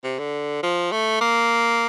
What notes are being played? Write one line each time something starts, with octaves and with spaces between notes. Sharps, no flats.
C3
D3
F3
A3
A#3